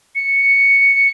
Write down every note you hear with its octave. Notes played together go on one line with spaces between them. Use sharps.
C#7